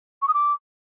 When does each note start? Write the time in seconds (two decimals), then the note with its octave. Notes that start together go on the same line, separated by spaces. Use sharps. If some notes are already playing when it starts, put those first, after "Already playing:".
0.22 C#6
0.28 D#6
0.34 D6